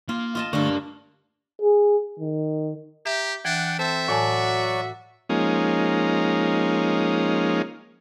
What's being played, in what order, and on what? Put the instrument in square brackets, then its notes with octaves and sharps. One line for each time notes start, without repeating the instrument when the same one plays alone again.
[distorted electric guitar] A#3 [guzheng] F4
[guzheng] F4 D#5 A5
[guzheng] G2 D4 [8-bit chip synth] D3 A3 C#6 [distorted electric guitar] A#4 F5
[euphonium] G#4
D#3
[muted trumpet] G4 [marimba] E5 [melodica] A#5
[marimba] E3 [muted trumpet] D4 [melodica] F#5 [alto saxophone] G5
[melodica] C4 A4 A5 [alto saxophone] C5 [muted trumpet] E5
[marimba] A2 G#5 A5 [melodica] F#3 D5 C#6 [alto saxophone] F#4
[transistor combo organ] F3 G#3 A#3 C#4 D#4